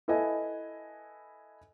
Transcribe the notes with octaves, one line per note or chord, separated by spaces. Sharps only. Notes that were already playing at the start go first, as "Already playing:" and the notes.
E4 A4 B4 D#5 G#5